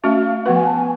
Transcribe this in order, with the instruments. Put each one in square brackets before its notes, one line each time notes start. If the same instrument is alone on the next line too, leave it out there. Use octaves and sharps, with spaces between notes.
[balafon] A3 C#4 F#4 [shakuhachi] F5
[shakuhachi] F5
[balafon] F3 B3 F#4 B4 [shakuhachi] F#5
[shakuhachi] G#5
A5
G#5